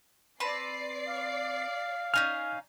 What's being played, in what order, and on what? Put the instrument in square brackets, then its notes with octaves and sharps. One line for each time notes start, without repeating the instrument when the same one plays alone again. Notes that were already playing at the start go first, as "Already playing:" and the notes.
[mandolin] C4 B4 A5 [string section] D5 C7
[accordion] F5
[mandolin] C#4 D#4 G#5 [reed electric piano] F6